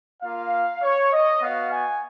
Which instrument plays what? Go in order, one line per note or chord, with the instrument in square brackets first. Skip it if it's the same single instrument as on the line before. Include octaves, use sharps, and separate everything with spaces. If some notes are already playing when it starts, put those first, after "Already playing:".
[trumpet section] A#3 F4 F5
C#5
D#5
B3 F#4 F5
G#5